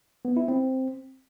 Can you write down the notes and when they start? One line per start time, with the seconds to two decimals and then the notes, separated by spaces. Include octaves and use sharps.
0.25 B3
0.37 E4
0.48 C4